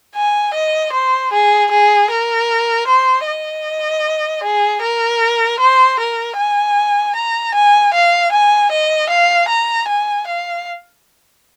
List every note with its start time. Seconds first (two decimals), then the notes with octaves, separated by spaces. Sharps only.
0.15 G#5
0.53 D#5
0.92 C5
1.32 G#4
1.71 G#4
2.10 A#4
2.87 C5
3.26 D#5
4.43 G#4
4.81 A#4
5.60 C5
5.99 A#4
6.37 G#5
7.15 A#5
7.54 G#5
7.93 F5
8.32 G#5
8.71 D#5
9.09 F5
9.48 A#5
9.88 G#5
10.26 F5